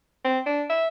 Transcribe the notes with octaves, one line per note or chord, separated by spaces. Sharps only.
C4
D4
E5